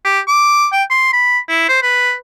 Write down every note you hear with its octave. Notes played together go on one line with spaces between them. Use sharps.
G4
D6
G5
C6
B5
E4
C5
B4